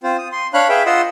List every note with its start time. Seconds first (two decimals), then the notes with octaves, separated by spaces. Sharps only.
0.03 C4 F4 C5
0.19 D#6
0.32 C6
0.54 D4 C#5 F5 B5 F#6
0.69 G#4 B4 E5 F5 G5
0.86 F4 D#5 F#5 C6 E6